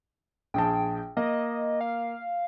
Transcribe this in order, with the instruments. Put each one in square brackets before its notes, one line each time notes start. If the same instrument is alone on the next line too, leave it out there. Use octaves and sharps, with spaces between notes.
[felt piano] A#1 G#4 A5 [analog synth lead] G5
[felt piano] A#3 [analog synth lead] D#5
[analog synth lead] F5